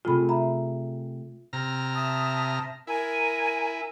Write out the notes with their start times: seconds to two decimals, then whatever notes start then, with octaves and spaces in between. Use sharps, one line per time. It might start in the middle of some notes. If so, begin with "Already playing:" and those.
0.05 C3 A3 F4 G#4 B5
0.29 E5 A#5 B5
1.53 C3 A#5 F6
1.93 E5 A5 D#6
2.87 E4 A#4 G#5